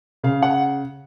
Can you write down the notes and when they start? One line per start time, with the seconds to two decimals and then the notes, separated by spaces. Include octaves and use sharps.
0.23 C#3 F5
0.43 F#5